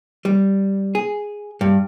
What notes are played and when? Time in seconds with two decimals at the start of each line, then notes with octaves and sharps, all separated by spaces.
0.25 G3
0.95 G#4
1.61 G2